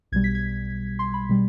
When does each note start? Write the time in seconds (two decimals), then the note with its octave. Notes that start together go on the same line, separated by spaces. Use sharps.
0.12 B1 B2 G3 G#6
0.24 B6
0.35 G#6
0.99 C6
1.14 B5
1.29 B2 G3